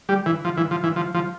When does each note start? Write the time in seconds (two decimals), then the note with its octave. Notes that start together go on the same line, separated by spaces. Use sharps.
0.09 G3
0.26 E3
0.45 F3
0.57 E3
0.71 F3
0.84 E3
0.96 F3
1.14 F3